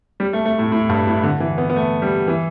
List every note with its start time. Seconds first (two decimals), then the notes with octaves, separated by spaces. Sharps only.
0.20 G3
0.33 A3
0.45 A3
0.59 A2
0.72 A2
0.89 G2
1.07 A2
1.24 D3
1.40 E3
1.58 B3
1.70 B3
1.76 A3
2.02 G3
2.28 E3